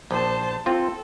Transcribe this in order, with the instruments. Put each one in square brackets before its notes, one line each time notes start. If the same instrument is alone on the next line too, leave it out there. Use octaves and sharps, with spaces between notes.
[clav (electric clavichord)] A#1 [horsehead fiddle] C5 A5
[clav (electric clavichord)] C4 F4 [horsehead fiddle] A4